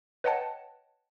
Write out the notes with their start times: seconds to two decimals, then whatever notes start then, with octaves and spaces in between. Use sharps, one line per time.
0.24 B4 C#5 D#5 F#5 G5 A5